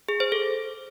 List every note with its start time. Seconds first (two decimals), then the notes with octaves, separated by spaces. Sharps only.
0.09 G#4
0.20 C5
0.32 A4